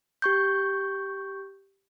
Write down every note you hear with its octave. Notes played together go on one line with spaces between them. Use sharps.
G4 C#6 G6